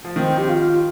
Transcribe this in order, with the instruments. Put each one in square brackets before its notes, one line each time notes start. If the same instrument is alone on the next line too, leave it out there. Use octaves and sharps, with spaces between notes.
[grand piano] F3
[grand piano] D#3 [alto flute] C4
[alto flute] G4
F4